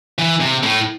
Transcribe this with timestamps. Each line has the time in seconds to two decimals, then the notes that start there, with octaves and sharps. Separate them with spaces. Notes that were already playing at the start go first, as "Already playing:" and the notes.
0.18 E3
0.40 C3
0.63 A2